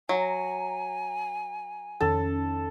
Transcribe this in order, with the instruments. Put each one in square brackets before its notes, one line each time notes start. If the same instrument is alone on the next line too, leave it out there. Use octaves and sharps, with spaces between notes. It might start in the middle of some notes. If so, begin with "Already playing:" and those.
[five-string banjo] F#3 [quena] G#5 [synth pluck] A#5
[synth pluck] F2 D#3 C#4 [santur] A4